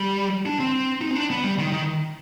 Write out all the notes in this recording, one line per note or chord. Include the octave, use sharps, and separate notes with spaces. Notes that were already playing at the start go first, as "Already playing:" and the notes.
Already playing: G3
D4
C4
D#4
C4
D4
B3
G3
D#3
D#3